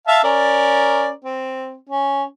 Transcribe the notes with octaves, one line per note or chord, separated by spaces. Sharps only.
E5 F5 A5
C#4 A#4 D5
C4
C#4